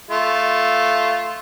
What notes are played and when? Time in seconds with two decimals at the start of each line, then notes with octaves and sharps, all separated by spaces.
0.11 A3 F4